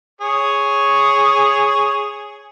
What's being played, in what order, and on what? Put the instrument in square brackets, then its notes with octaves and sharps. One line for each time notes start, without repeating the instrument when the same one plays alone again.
[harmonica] G#4 C#5